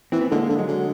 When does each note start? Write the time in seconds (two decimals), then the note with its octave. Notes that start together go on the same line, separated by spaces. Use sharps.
0.12 E3 C4
0.21 B3
0.32 D3 G#3 A#3
0.50 D3
0.58 F#3 G#3
0.69 D3